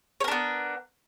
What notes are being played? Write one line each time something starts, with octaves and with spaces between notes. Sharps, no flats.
B3 D4 A#4 C#5